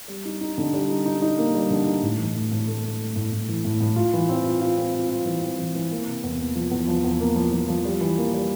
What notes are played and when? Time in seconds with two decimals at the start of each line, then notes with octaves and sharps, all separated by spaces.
0.08 G3
0.25 D#4
0.41 D#4
0.58 D3
0.74 G3
0.90 D#4
1.06 D#4
1.22 D#4
1.38 A#3
1.55 G3
1.71 D3
1.86 D#4
2.02 A2
2.18 E3
2.35 A2
2.52 A2
2.67 A3
2.84 A3
3.00 A3
3.16 A2
3.32 A2
3.49 E3
3.65 A2
3.80 A2
3.96 F4
4.13 E3
4.29 C4
4.46 F4
4.61 F4
4.77 C4
4.94 F4
5.10 F4
5.26 E3
5.42 C4
5.59 E3
5.75 E3
5.91 A#3
6.07 C3
6.23 E2
6.39 A#3
6.55 F3
6.71 E2
6.88 F3
7.04 E2
7.20 A#3
7.36 F3
7.53 F3
7.69 F3
7.85 G3
8.01 E3
8.18 A#3
8.34 G3